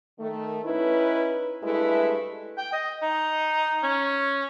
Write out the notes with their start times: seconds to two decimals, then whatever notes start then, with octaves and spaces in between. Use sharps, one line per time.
0.19 D#3 A3
0.65 C#4 D#4 E4 B4
1.63 G2 G#3 A3 E4 B4
2.58 G5
2.73 D#5
3.02 D#4
3.83 C#4